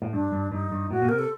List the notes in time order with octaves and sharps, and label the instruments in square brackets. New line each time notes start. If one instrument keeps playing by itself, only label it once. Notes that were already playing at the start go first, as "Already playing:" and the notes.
[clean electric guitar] A2
[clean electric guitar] G2 [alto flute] D4
[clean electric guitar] G2
[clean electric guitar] G2 [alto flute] D#4
[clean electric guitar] G2
[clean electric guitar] A2 [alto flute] F#4
[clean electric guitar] A#2
[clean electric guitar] C3 [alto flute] A#4
[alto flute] A4